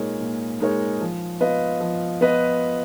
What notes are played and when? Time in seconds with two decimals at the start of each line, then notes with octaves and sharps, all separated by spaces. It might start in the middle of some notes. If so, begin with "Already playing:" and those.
Already playing: A#2 G#3 D#4 A#4 C#5
0.21 A#2
0.60 G#3 D#4 A#4 C#5
1.01 F3
1.40 B3 F4 B4 D#5
1.81 F3
2.21 B3 F4 B4 D#5